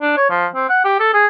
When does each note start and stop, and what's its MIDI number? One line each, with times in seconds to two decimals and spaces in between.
0.02 0.12 62
0.17 0.28 73
0.30 0.47 53
0.55 0.68 60
0.69 0.80 78
0.85 0.99 67
1.00 1.12 69
1.14 1.26 68